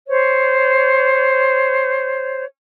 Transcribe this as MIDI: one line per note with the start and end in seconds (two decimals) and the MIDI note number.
0.07 2.44 72
0.07 2.44 73